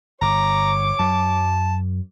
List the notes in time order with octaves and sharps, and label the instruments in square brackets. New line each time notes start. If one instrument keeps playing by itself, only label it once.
[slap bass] G1 [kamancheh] C#5 D6 [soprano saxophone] A#5
[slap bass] F#2 F#3 [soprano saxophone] A5